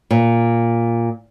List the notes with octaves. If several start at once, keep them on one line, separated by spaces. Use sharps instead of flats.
A#2